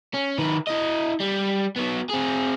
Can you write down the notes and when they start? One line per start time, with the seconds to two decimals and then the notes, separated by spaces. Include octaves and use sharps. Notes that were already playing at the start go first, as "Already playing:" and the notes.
0.14 C#4
0.39 D#3 B4
0.67 E4 D#5
1.21 G3
1.76 F#3 B3
2.09 C4 G#4